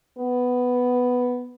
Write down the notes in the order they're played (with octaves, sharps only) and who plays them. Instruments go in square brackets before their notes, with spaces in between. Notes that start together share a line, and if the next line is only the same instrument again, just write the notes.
[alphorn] B3